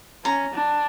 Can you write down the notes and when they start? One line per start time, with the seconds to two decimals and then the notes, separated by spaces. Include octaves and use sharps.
0.25 C#4 A#5
0.54 D4